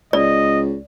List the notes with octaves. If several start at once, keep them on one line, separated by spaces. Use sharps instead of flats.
C#2 D5 D#5